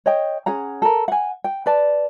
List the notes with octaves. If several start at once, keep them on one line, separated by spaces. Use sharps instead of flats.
C#5 D#5 G5
C#4 G#4 F#5 A#5
A4 A#4
F#5 G#5
G5
B4 D5 A5